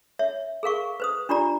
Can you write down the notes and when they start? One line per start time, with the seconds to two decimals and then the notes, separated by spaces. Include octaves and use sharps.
0.19 C#5 E5
0.63 G#4 A#4 F5 C#6
1.00 B4 C5 D#6
1.29 D4 F4 G4 D5 A#5